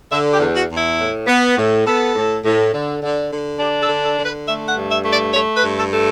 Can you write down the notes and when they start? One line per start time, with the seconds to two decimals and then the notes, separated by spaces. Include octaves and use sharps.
0.11 D3 E5
0.34 G4
0.40 E2
0.56 F#4
0.69 E2
0.77 E4
0.99 A2
1.27 B3
1.57 A2
1.86 B3 A4
2.15 A2
2.44 A2
2.73 D3
3.02 D3
3.31 D3
3.59 D4 G4
3.82 A4
3.89 D3
4.04 A4
4.18 D3
4.25 B4
4.46 A3 E5
4.68 F#5
4.76 G2
4.91 E5
5.05 A3
5.12 D5
5.33 A3 C#5
5.56 B4
5.63 G2
5.78 A4
5.92 A3